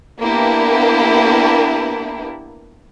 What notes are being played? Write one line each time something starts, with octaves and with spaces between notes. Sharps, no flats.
A#3 B3 D4 E4 G4 A#4